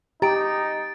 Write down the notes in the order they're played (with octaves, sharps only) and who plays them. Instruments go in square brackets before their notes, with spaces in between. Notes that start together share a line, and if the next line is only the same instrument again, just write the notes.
[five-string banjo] G#3 A#5 [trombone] D#4 [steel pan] G4 [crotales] A6 D7